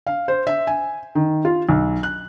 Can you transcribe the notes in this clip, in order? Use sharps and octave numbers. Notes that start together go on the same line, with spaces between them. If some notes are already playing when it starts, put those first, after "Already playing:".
F5
C5
E5
G#5
D#3
F4
B1
F#6